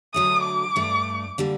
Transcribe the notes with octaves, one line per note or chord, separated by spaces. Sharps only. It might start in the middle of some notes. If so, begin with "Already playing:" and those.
D3 F#3 A3 D#6
D6
G2 D3 A3
D3 G3 A#3